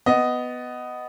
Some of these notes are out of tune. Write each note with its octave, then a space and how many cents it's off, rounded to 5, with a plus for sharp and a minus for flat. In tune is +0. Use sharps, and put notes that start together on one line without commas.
B3 +10 D#5 +0